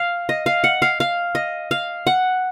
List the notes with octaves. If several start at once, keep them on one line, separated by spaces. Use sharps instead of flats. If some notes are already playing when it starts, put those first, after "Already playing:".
Already playing: F5
D#5
F5
F#5
F5
F5
D#5
F5
F#5